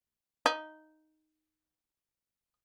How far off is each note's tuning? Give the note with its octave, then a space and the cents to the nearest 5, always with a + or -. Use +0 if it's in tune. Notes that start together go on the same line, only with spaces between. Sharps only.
D#4 +0